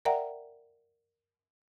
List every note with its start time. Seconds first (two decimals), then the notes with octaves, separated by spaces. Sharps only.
0.05 A#4 D5 E5 F#5 G5 A#5